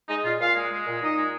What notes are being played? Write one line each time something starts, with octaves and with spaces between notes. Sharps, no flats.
G#3 D#4 D#5
A#2 F4 F5
A#2 F4 F5
G#3
G#3
A#2
A#2 D#4 D#5
G#3